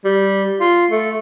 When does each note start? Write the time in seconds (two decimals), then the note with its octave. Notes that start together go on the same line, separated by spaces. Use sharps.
0.05 G3
0.60 F4
0.91 A3